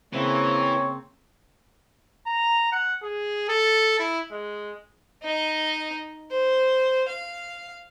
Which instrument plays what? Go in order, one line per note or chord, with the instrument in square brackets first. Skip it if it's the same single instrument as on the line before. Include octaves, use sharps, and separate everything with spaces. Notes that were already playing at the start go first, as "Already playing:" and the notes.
[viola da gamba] C#3 A#3 [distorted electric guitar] E3 [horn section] C4 [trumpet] C#5
[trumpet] A#5
F#5
G#4
A4
E4
G#3
[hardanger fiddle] D#4 D#5
C5
F5